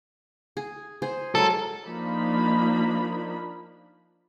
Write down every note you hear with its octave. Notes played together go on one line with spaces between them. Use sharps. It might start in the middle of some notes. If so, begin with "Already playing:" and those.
G#4
G#4 C5
F#3 G#3 A4 A#4
F3 A#3 D4 D#4 B5